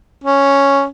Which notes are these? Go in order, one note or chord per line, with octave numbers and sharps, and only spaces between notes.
C#4